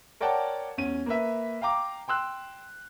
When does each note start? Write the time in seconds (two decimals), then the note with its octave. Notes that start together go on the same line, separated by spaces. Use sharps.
0.21 A#4 C#5 D5 F#5 G5 A5
0.77 E2 C#4 D#7
1.06 A#3 B4 E5
1.61 F5 G5 A#5 D6
2.08 G5 C6 E6 F#6